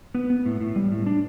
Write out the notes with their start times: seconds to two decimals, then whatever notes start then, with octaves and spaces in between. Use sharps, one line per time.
0.15 B3 B4
0.30 B3
0.46 A2
0.61 A2
0.76 G3
0.92 A2
1.06 D4